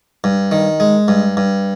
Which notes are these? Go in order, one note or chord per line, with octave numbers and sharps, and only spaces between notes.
G2
D#3
G#3
G2
G2